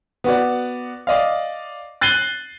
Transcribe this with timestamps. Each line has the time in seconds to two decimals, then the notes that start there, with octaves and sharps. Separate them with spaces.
0.24 B3 F#4 D5
1.07 D5 D#5 F5
2.01 F#6 A6 C7 D#7 F#7 G7